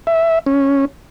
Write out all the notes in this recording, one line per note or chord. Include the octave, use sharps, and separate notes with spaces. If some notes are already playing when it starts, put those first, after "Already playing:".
E5
C#4